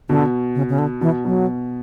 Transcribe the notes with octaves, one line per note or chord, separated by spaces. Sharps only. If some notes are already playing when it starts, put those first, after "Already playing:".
B2 D3
C#3
C#3
D3
B2 E3
B2 F#3